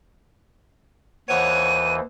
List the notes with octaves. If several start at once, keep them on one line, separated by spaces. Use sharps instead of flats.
D#2 E3 C5 C#5 F#5 D#7